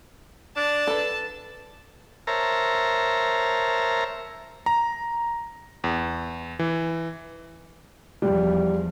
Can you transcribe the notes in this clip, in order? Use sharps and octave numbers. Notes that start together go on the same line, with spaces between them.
D4 A5
A4 B4
A#4 C5 C#5 E5 A5 A#5
A#5
E2
E3
E2 F3 G3